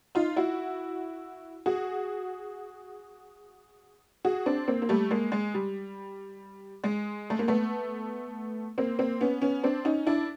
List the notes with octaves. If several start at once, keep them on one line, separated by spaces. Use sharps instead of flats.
D#4 F4
E4 F#4
F#4 G#4
F#4 G#4
C4 D4
A#3 C4
A#3
G3 A3
G#3 A#3
G#3
G3
G#3
A3
A#3
A3 B3
A#3 C4
A#3 C4
B3 C#4
B3 C#4
C4 D4
C#4 D#4
D4 E4